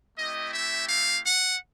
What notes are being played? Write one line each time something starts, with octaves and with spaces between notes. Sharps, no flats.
A3 C4 E4 G4 D#5
E5
F5
F#5